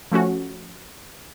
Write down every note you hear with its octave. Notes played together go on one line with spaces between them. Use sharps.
F3 A3 C#4 F#4